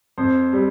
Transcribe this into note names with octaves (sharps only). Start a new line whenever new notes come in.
F2 C5
G3